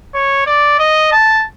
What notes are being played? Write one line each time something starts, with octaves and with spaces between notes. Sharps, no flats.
C#5
D5
D#5
A5